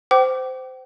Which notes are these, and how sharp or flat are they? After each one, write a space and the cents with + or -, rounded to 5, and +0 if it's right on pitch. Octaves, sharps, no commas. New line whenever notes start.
C5 -20 G5 -35 D6 +0